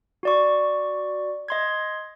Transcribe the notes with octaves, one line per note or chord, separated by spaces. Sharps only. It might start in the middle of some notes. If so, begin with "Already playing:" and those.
F#4 D5 C#6
D#5 C6 G#6